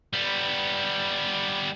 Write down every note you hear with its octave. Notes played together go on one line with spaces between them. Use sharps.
G3 B3